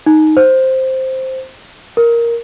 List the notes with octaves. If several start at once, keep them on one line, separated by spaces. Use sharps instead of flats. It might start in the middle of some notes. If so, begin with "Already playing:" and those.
D#4
C5
A#4